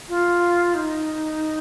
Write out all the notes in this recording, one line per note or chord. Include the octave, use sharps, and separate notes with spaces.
F4
D#4